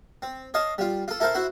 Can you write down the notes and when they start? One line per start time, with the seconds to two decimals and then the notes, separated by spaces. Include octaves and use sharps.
0.22 C4
0.54 C#5 D#5 F5 A5
0.78 G3 F4
1.08 F4 A4
1.20 E4 A4 A#4 C5 F5
1.35 E4 F#4 C5